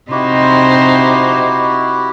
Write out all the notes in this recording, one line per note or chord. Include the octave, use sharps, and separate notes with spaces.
C3 D#4 E4 F#4 G4 C5